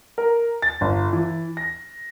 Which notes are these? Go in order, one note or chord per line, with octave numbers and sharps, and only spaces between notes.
A#4
A6
G1
E3
A#6